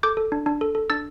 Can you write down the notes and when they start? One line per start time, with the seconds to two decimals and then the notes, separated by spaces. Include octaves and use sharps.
0.03 A4 D6 G6
0.17 A4
0.32 D4
0.46 D4
0.61 A4
0.75 A4
0.90 D4 E6 A6